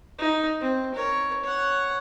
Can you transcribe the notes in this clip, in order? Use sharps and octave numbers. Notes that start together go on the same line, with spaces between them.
D#4
C4
A#4 C#5
C#5 F#5